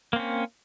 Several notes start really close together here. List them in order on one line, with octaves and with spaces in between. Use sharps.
A#3 C4 C#4